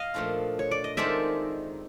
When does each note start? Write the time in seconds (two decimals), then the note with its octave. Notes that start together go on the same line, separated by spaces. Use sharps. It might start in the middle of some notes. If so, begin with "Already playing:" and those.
Already playing: D#5 F5
0.14 A#2 F3 A3 D4 F4
0.59 C#5
0.71 D5
0.84 D#5
0.97 D#3 G#3 C4 F4 A4 D5 E5